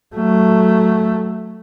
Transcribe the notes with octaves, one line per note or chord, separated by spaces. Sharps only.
F#3 A3